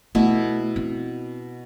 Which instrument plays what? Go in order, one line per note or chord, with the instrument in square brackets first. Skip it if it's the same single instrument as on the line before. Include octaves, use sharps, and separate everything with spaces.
[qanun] B2 E4 [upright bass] A3
[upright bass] C4